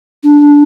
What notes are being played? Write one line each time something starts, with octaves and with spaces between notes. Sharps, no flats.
D4